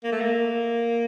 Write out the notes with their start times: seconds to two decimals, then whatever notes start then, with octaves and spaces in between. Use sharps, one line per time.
0.04 A#3
0.12 A3
0.20 A#3